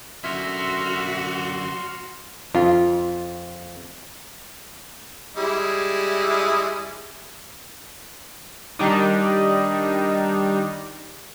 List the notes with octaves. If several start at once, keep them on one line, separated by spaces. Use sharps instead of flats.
F#2 D3 F#4 E5 C6 F6
F2 F4
G3 G#3 E4
D#3 G3 D4 D#4